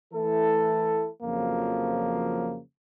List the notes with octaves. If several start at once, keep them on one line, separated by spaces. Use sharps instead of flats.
E3 A3 E4 A4
F2 C#3 F3 F#3 A#3